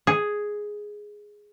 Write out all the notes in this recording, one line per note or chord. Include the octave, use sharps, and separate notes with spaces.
G#4